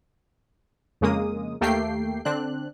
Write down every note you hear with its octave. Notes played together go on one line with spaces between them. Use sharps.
F2 C#3 G#3 A#3 D#6
D#2 A3 A#3 G4 G5 C7
D3 C4 D4 F#6